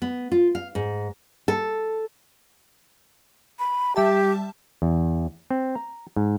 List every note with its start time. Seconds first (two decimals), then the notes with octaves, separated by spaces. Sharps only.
0.02 B3
0.32 F4
0.55 F5
0.75 G#2
1.48 A4
3.59 B5
3.96 G3 G4 E5 A5
4.82 E2
5.50 C4
5.75 A#5
6.16 G#2